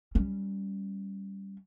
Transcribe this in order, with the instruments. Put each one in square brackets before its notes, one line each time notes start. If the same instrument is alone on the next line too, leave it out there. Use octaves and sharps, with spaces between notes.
[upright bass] G3 C#4